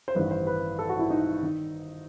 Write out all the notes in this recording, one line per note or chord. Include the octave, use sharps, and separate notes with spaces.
C5
A1 G2 D#3 B4
C5
B4
A4
F#4
E4
D#4
D#3